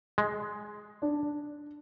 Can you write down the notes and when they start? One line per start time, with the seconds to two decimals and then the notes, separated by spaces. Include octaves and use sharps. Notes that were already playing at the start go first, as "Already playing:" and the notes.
0.18 G#3
1.02 D4